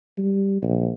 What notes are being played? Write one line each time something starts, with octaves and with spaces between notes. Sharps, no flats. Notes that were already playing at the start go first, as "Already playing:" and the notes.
G3
A#1